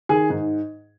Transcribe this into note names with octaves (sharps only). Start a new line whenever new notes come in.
D#3 G#4
G#2